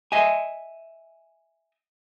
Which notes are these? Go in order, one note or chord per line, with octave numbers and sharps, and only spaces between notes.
D#5 E5 G#5